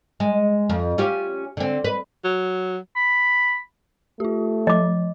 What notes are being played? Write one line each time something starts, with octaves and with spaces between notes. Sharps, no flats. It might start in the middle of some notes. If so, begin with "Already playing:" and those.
G#3
F2
C#4 F4 G4
D3 C4
B4
F#3
B5
A3 F4 G4
F3 D#5 D6